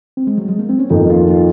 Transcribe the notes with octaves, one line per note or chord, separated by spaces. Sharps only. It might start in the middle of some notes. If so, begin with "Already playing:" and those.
C4
G#3
F#3
G#3
A#3
C4
C#4
F2 D#3 A#3 D#4
F4
F4